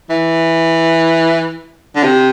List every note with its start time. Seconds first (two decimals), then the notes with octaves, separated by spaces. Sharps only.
0.10 E3
1.96 D3
2.03 C3